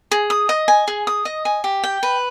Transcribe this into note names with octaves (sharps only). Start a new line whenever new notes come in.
G#4
D#6
D#5
G#5
G#4
D#6
D#5
G#5
G4
G5
B4